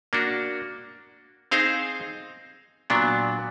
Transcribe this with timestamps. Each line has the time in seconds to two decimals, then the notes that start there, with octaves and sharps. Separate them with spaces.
0.13 A#3 D4 F#4
1.51 C4 D#4 G#4 C5 F5
2.90 A#2 F#3 B3 D4